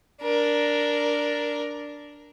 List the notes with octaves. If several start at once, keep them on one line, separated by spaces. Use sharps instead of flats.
D4 A#4